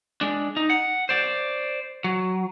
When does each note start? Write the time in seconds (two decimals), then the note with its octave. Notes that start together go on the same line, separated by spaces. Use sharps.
0.21 G#3 D4
0.57 D#4
0.70 F#5
1.09 C5 D5
2.04 F#3